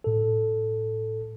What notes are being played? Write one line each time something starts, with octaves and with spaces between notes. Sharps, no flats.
A2 A4